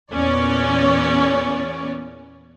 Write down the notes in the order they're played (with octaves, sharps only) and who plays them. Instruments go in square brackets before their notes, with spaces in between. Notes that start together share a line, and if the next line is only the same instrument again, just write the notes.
[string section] E2 A#2 B3 C#4 C#5 D5